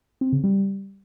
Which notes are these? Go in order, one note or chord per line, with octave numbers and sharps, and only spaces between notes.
C4
C#3
G3